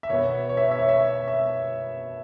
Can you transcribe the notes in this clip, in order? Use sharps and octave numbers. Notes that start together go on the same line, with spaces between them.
E5
B2 B3 C#5
C#5
E5
C#5
E5
C#5
E5
E5